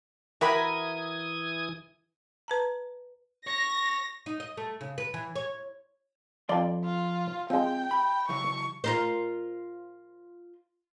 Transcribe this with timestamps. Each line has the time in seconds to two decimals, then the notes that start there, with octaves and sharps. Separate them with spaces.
0.41 E3 F#4 G4 A#4 E5 B5 D#6 G#6
2.48 B4 A5 A#5
3.47 C#5 A#6
4.26 D#4
4.40 D#5
4.57 A3
4.81 C#3
4.98 B4
5.14 E3
5.35 C#5
6.49 F2 F3 D5 C6
6.84 F4
7.50 F3 G#3 C4 G5
7.91 B5
8.29 C#3 E3 F#3 C#6
8.84 F4 A#4 C5